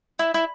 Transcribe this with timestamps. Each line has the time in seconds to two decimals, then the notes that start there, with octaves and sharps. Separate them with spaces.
0.19 E4
0.34 E4